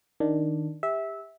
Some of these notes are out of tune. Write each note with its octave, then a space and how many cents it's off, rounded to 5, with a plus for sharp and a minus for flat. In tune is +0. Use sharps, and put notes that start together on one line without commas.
D#3 +0 D4 +0
G4 +25 E5 -15